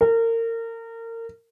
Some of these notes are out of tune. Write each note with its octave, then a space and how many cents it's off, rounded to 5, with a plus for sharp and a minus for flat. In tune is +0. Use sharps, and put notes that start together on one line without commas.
A#4 -30